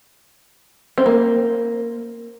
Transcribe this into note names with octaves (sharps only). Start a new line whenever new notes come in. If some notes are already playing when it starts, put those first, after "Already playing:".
C4
A#3